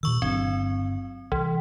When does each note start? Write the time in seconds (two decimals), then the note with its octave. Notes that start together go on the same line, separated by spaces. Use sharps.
0.03 A#2 D#3 C#6 E6
0.22 G1 F#3 C4 D4
1.32 C2 E3